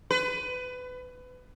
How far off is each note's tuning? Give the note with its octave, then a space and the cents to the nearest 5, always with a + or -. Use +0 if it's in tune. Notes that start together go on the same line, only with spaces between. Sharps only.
B4 +25